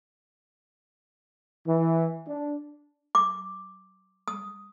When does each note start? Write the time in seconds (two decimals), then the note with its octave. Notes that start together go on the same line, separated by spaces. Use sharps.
1.66 E3
2.27 D4
3.15 D6
4.28 D#6